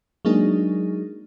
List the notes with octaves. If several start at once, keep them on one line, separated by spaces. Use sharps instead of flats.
F#3 G#3 A#3 D4 D#4 G#4